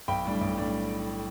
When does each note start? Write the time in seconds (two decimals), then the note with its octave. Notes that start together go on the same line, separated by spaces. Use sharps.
0.08 B1 G5 B5
0.25 A2 G3 D4
0.41 B1
0.57 A2 G3 D4